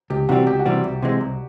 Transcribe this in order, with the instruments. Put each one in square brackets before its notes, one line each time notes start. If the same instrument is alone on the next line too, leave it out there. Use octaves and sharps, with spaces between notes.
[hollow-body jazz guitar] C#2 [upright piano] G4
[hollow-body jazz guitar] C3 E3 G3 C4 [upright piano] F#4
[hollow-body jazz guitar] C#2 [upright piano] G4
[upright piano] F#4
[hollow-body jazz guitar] C3 E3 G3 C4
C2
C3 E3 G#3
C2